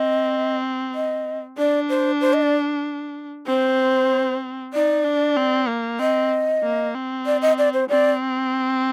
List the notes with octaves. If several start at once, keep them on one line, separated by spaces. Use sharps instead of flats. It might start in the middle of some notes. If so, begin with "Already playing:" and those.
Already playing: C4 D#5
D#5
D4 D5
C5
C5
D#5
D5
C4 C5
D#4 D5
D4
C4
A#3
C4 D#5
A#3
C4
D5
D#5
D5
C5
C4 D5